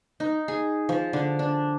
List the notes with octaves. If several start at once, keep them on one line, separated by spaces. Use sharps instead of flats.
D#4
G#4
F3
D3
D4